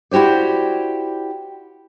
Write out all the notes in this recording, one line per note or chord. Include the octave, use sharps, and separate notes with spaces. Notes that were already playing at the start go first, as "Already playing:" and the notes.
E4 F#4 G4 C5 D5